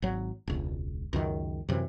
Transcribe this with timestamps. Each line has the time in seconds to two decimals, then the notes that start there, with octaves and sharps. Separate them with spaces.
0.02 G#1 F#3
0.48 E1 C#2
1.13 C#2 F#2 D#3
1.69 F#2 C3 E3